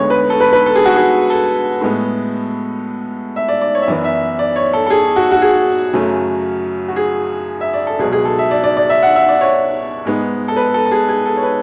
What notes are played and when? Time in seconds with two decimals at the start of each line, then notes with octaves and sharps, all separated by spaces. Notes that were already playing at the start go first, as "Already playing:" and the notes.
Already playing: D2 D3 G#3 B3 C#5
0.10 B4
0.30 A4
0.41 B4
0.53 B4
0.66 A4
0.76 G#4
0.85 F#4
0.96 G#4
1.30 A4
1.81 A2 G#3 B3
3.36 E5
3.48 D5
3.61 D5
3.75 C#5
3.82 E5
3.88 F#2 E3 B3 D5
4.04 E5
4.39 D5
4.56 C#5
4.73 A4
4.87 A4
4.90 G#4
5.16 F#4
5.32 F#4
5.42 G#4
5.93 F#2 C#3 F#3 A3
6.88 F#4
6.96 G#4
7.61 E5
7.74 D5
7.87 A4
7.99 C#2 B2 F#3 G#4
8.13 G#4
8.25 A4
8.39 E5
8.51 D5
8.64 D5
8.77 D5
8.89 E5
9.03 F#5
9.16 E5
9.29 D5
9.41 C#5
10.06 G#2 G#3 B3
10.48 A4
10.57 B4
10.74 A4
10.86 A4
10.92 G#4
11.09 G#4
11.26 A4
11.37 C#5
11.43 B4